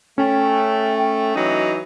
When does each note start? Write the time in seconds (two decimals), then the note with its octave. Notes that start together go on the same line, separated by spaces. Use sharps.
0.18 A3 C#4 G5
0.98 G5
1.35 E3 F#3 D#4 D#5